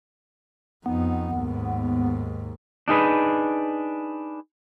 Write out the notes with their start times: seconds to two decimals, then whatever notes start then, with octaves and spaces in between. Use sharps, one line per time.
0.86 F2 B3 D#4
1.36 D#2 G#2
2.88 D4 D#4 G#4 B4